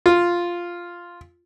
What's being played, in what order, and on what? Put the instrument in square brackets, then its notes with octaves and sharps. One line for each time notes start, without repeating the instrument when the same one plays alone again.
[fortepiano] F4